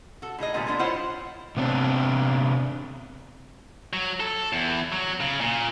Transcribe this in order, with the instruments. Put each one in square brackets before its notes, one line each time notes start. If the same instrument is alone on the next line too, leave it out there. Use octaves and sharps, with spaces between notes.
[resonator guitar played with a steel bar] F#4 A4
A2 D#4 G#4 D#5
A#2 D3 F3 G3 A3 B3
G#3 A#3 B3 D4
E4 F4 C5 C#5 D#5 F#5
[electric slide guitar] C3 B3 C4 D4
[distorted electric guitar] F#3
A4
E2
F#3
C#3
A#2